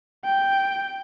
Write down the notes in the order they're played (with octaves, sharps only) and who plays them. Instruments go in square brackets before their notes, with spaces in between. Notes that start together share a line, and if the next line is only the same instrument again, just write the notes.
[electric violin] G5